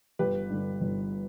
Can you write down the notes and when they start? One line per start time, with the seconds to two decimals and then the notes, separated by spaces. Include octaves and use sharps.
0.19 G1 G4 B4
0.50 G2 D3
0.81 G1